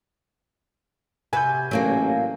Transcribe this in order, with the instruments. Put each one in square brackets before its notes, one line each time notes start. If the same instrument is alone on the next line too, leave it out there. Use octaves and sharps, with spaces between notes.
[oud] C3 F#4 B4 [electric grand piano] G#5 G6
[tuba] A1 [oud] F#3 A#3 D4